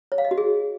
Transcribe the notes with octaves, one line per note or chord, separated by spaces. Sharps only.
C#5
F5
D#5
F#4
G#4